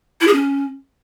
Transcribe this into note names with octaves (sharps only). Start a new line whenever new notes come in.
E4
G#4
C#4